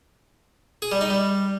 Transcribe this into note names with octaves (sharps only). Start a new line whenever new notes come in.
G#4
G3
D#4
G3